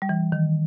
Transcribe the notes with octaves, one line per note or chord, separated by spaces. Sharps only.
G3
E3
D#3